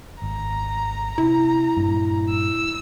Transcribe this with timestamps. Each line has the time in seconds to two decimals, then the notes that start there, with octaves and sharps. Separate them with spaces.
0.22 G#1 A#5
1.18 C3 E4
1.77 G2 A#2
2.30 E6